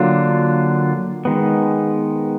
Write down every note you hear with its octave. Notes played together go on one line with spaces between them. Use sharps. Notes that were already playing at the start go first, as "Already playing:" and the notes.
Already playing: D3 F#3 A#3 D4 F4
D#3 G#3 B3